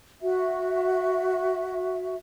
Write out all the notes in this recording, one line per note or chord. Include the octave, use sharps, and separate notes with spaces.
F#4 E5